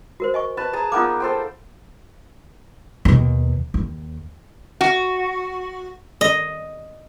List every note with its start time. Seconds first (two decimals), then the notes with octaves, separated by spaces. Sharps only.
0.20 F#4 A#4 C5
0.34 D#5 G#5 C#6
0.57 B4 A5
0.73 G#4 A5 A#5
0.92 A#3 B3 D#4 F4 G#5 D6
1.20 A4 C5 G5
3.05 D#2 B2
3.74 D#2
4.81 F#4
6.21 D#5